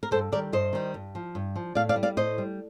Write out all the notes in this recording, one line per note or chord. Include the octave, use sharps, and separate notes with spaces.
A#4
G2 A4 C5
D#3 G3 A#4 D5
G2 C5 D#5
D#3 G3
G2
F3
G2
F3
A2 D5 F5
D5 F5
G3
D5 F5
A2 C5 D#5
G3